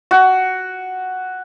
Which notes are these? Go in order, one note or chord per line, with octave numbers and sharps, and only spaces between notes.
F#4